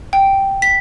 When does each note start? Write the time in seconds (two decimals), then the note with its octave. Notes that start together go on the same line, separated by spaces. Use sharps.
0.13 G5
0.62 B6